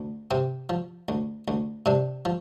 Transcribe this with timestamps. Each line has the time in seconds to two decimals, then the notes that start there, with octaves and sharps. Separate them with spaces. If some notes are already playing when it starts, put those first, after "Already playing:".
Already playing: D2
0.31 C3 C4
0.69 F3
1.08 D2
1.48 D2
1.86 C3 D4
2.25 F3